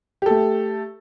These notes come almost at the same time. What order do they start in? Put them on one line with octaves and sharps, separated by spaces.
G4 A4 A3